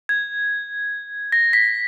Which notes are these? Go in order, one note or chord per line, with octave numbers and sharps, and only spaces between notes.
G#6
A#6
B6